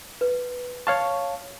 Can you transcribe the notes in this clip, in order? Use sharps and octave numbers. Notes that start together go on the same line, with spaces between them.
B4
C#5 F5 A5 C#6